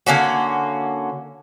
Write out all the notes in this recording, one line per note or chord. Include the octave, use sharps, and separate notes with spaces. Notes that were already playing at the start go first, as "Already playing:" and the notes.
D3 A#3 C#4 F#4